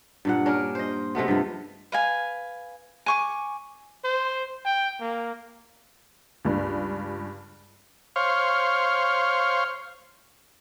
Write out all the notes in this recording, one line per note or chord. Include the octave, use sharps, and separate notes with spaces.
G2 A#2 F#5
C#4 D4 A#4
C5 D#5
C3 G#3 A3 B3
G2 F3
B4 F5 G#5
G#5 C#6 D6
C5
G5
A#3
C#2 G2
C5 C#5 F5